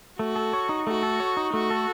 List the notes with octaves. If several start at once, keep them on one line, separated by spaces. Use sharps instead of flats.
A3 F#4
A4
C#5
D#4
A3 F#4
A4
C#5
D#4
A3 F#4
A4